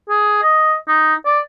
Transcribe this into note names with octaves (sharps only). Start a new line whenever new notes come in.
G#4
D#5
D#4
D5